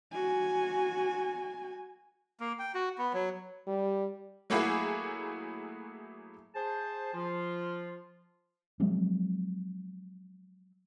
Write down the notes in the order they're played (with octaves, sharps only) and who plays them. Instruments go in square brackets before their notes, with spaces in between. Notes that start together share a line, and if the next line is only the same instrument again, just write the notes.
[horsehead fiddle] F#4 G#5
[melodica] A#3
G5
F#4
B3
F#3
[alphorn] G3
[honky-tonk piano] F#3 A3 A#3 E4 F#4 G#4
[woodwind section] G#4 C5 A5
F3 F4
[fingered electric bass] F3 F#3 G#3 C4